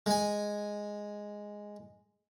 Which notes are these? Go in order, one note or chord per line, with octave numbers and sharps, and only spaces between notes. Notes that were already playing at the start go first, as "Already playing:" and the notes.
G#3 G#5